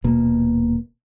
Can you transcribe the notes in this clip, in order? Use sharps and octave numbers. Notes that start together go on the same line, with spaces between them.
D#1 B2 A#3